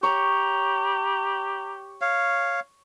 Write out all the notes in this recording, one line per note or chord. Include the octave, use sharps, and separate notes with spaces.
G4 C#5 A#5
C#5 F5